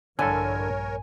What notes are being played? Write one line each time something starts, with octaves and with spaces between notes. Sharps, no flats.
A#1 G2 D3 E4 A4 A#4 C#5 G#5